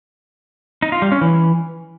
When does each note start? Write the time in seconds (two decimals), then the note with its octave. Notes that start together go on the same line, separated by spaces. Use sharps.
0.82 D#4
0.92 F4
1.02 G3
1.12 C#4
1.21 E3